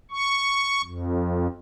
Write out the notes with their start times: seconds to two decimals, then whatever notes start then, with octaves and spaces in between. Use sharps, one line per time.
0.11 C#6
0.84 F2